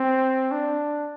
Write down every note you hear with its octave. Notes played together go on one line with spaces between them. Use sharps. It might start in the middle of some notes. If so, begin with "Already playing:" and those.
Already playing: C4
D4